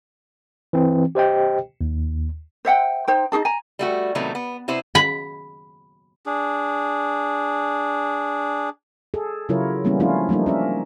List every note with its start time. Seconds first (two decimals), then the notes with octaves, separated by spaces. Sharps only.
0.73 E3 C4
1.15 G4 C5 D#5 G5
1.81 D#2
2.65 C5 E5 F#5 G5
3.08 D#4 C5 G5
3.32 D#4 F#4 G#4 A5
3.45 G#5 A#5
3.79 G3 A3 F#4
4.15 A2 C3 D#3 F#3 A3 B3
4.35 B3
4.68 C3 B3 E4 C5
4.95 B5
6.25 D4 G#4
9.14 G#4 A4
9.49 C#3 F#3 E4 F4 A#4 C#5
9.84 E3 G3 A#3 B3 C#4 E4
10.00 F3 A3 C#4 D4 E4 F4
10.29 F3 G3 A3 A#3 D4 D#4
10.46 C#4 A#4 E5